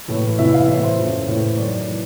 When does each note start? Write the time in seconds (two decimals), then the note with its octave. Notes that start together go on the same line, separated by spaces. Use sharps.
0.08 A2 E3
0.38 E2 C3 E3 E5
0.54 F5
0.69 A2 E3 E5
0.83 C5
0.98 F2 C#3 E3
1.28 A2 E3
1.57 F#2 D#3 D5
1.88 E3